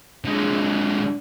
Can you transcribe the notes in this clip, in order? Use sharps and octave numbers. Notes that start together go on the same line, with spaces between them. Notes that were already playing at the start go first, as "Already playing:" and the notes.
D3 G#3